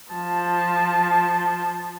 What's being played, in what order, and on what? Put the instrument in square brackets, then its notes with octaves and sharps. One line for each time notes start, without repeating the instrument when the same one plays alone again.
[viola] F3 A5